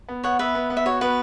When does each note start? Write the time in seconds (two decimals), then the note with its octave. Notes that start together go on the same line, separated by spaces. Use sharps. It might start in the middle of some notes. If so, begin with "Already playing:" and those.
0.09 B3
0.24 B3 C#5 F#5
0.39 B3 B4 E5
0.55 B3
0.70 B3
0.77 E5
0.86 F#4 C#5
1.01 B3 B4